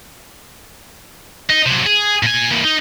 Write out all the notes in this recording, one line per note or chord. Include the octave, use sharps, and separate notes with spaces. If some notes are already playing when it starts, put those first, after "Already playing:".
D#4
C3 F#3
G#4
A#2 G#5
E3 A#3
D#4